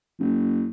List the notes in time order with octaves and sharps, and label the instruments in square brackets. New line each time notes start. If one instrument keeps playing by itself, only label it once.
[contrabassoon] F#1